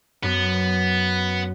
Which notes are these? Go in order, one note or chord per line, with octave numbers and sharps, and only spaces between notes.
F#2 B3